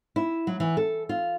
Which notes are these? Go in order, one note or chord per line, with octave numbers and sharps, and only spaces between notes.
E4
F#3
E3
A4
F4